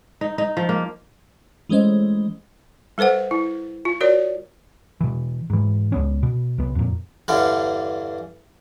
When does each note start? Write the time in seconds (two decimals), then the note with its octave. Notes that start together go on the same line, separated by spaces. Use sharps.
0.21 D#4
0.38 D#4
0.57 F3
0.69 A#3
1.69 E3 G#3 A3 C#4 C5 D#5
2.98 G3 A4 B4 C5 F#5
3.31 E4
3.85 F4
4.01 F#4 A#4 C#5 D5
5.01 B2 E3
5.50 G#2 E3
5.92 C#2 B3 C#4
6.23 B2
6.58 C2 B3
6.75 F2 A#2
7.28 E2 G2 D3 C#4